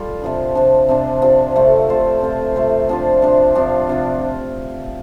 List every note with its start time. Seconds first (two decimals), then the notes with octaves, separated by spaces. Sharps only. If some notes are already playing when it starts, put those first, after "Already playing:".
Already playing: G3 F4 A4
0.22 C3 F3 D4
0.55 C3 F3 D4
0.88 C3 F3 D4
1.22 C3 F3 D4
1.56 C3 A3 F4 C5
1.89 C3 A3 F4 C5
2.21 C3 A3 F4 C5
2.56 C3 A3 F4 C5
2.89 C3 F3 D4 F4
3.22 C3 F3 D4 F4
3.55 C3 F3 D4 F4
3.89 C3 F3 D4 F4